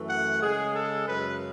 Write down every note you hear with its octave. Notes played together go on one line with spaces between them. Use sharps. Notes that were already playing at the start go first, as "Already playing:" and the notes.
Already playing: F#2 E3 A3
F#5
C#3 G#3 G#4
A4
F#2 C#3 G#3 B4